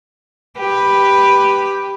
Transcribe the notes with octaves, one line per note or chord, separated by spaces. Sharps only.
G4 B4